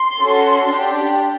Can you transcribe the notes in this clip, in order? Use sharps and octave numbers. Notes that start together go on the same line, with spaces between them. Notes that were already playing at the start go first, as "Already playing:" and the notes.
Already playing: C6
C#4 F#4 A4
D4 G4